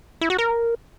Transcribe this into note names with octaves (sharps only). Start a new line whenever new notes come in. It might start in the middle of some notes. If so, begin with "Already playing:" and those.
E4
F#4
A#4